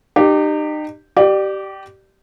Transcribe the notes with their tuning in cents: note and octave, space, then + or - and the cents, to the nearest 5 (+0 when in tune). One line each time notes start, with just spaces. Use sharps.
D#4 -35 G4 +0
G4 -20 D5 +25